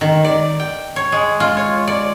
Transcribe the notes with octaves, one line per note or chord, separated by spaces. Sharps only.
D#3
D5
G5
C#5
G#3
F4
C#5
D5